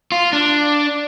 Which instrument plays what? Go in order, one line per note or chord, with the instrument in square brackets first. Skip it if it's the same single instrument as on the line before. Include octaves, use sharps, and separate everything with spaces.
[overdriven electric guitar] F4
D4